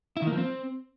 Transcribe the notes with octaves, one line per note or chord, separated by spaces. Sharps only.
E4
D#3
A#3
F3
C4